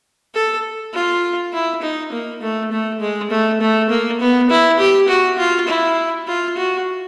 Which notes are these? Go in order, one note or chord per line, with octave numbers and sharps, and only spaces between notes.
A4
F4
E4
D#4
A#3
A3
A3
G#3
A3
A3
A#3
B3
E4
G4
F#4
F4
E4
F4
F#4